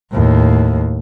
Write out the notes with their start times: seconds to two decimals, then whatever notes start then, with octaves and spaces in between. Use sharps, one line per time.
0.11 D#2 A2